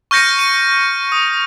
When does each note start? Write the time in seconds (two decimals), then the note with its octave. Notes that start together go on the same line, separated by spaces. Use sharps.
0.11 C#6 F6 G6 A#6 C#7 D#7
0.39 D#7
1.12 D#6